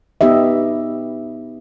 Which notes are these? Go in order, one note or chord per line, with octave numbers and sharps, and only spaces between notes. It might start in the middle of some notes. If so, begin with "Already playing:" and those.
B3 D#4 G4 D#5 E5